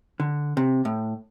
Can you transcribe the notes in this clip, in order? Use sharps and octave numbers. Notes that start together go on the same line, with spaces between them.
D3
C3
A2